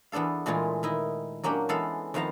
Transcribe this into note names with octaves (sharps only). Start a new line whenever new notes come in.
E2 B3 D4 A4 F5
A#2 E3 G#3 A3 F4 G#4
D#3 E4 D#5
F#3 A#3 C#4 D4 G4
E3 G#3 B3 A4 F5 F#5
F2 D#3 B3 F5 A5 A#5